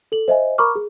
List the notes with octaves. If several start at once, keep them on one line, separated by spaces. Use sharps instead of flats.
A4 F#7
C5 D#5 E5 G#5
A#4 A#5 B5 C#6 D6 F6
G#4